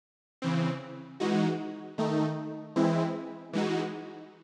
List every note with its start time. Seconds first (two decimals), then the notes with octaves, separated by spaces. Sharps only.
0.42 C#3 E3 C4
1.20 E3 G#3 D#4 F#4
1.98 D#3 A3 D#4
2.76 E3 G#3 C4 E4
3.53 E3 G#3 D#4 F#4